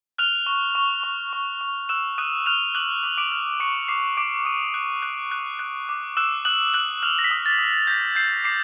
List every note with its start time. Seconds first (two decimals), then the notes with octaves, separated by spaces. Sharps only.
0.18 F6 F#6 F7
0.46 C#6
0.75 C#6
1.03 C#6
1.33 C#6
1.61 C#6
1.89 E6 F#6 E7
2.18 D#6 F#6 D#7
2.46 F6 F#6 F7
2.75 D6 F#6 F#7
3.03 D6
3.18 D6 D7
3.32 F6
3.60 C#6 D6 C#7
3.88 D6 C7
4.17 D6 D7
4.45 D6 D#6 D#7
4.74 F#6
5.02 F#6
5.32 F#6
5.59 F#6
5.89 D6
6.17 E6 F#6 E7
6.45 D#6 F#6 F#7
6.74 D#6 F#6 F#7
7.03 F6 F#6 F7
7.19 A#6
7.24 B6
7.31 D#6
7.46 A6
7.59 D#6
7.87 G6 A#6
8.16 G6 C7
8.44 D6 C7